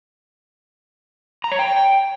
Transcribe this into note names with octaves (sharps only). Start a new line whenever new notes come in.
A#5
C#5
G5